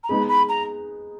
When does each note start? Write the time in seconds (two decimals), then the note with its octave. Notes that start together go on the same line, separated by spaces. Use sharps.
0.04 A#5
0.09 G#3 B3 D#4 G#4 B5
0.29 B5
0.49 A#5